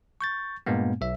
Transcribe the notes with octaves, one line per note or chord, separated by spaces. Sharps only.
C#6 G6 A6
G2 A#2 G#3 A#3 B3
B1 E5